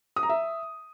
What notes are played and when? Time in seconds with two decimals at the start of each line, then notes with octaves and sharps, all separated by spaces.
0.16 D#6
0.23 A#5
0.29 E5